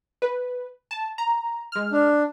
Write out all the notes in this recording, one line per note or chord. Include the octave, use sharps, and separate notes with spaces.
B4
A5
A#5
G#3 F6
D4